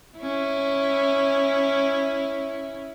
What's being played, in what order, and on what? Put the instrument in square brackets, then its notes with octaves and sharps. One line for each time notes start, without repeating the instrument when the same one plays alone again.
[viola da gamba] C#4 E4